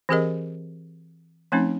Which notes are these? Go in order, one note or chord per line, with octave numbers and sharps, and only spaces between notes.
E3 C4 G4 G#4 A#4 D#5
F3 A3 C4 C#4 D#4